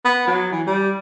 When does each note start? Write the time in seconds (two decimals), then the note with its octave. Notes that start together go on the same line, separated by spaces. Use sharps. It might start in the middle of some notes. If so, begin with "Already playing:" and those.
0.05 B3
0.27 F#3
0.52 E3
0.67 G3